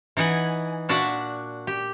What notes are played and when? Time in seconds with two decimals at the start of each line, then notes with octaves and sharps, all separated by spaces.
0.17 E3 D#4 F#5 G#5
0.89 A#2 D4 F#4 D5 E5 F#5
1.67 G4